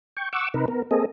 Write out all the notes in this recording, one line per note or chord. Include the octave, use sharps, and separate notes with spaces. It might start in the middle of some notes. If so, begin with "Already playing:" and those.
G5 C#6
F#5 C#6 D6 E6
C3 D#4 A#4 B4
B3 A#4
A#3 C4 G#4 A4 D#5